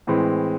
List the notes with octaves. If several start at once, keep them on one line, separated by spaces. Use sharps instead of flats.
A2 E3 G#3 C4